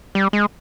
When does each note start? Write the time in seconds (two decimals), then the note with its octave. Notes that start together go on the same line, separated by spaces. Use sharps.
0.15 G3
0.33 G#3